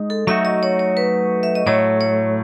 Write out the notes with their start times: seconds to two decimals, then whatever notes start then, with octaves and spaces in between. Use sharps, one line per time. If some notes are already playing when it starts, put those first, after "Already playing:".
Already playing: G#3 D#4
0.10 A4
0.27 F#3 A3 D#4 F#4 E5
0.45 D#5
0.63 C#5
0.79 C#5
0.97 B4
1.43 E5
1.55 D#5
1.66 A2 F#3 A3 C#5
2.01 C#5